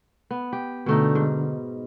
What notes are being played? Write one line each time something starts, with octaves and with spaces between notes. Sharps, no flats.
B3
G4
B2 D3 A3 D#4
G#2